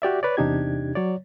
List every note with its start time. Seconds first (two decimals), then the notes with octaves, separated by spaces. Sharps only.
0.02 F#4 G4 D5 E5
0.23 B4 C#5 D5
0.37 E2 C3 D4 D#4 G4 G#6
0.95 F#3 C#5 D5